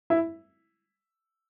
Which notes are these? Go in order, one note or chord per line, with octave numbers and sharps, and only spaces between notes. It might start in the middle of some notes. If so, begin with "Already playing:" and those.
E4 E5